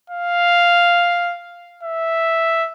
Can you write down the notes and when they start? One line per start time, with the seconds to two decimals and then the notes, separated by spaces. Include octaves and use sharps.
0.10 F5
1.83 E5